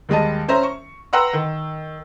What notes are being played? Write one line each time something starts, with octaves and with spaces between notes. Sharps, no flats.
D#2 G3 G#3 D#5 A5
C#4 C5 E5 A#5
C#6
B4 F#5 G5 A#5 C6 E6
D#3